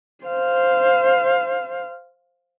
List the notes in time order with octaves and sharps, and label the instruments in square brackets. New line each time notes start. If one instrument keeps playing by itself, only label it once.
[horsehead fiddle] C5 F5